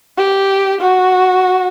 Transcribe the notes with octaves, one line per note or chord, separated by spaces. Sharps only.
G4
F#4